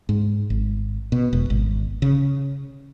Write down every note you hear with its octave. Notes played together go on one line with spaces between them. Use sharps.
G#2
G#1
B2
E1
G#1
C#3